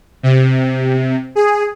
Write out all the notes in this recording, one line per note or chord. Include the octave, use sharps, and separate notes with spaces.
C3
G#4